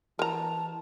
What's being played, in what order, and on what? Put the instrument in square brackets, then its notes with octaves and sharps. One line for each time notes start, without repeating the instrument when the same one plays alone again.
[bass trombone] E3 [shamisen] A#4 A#5 [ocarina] A5